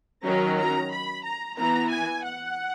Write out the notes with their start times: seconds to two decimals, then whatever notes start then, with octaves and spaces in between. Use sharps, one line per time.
0.24 D#3 F#3 C#4 A#5
0.58 A#5
0.91 B5
1.24 A#5
1.57 E3 B3 A#5
1.90 G#5
2.24 F#5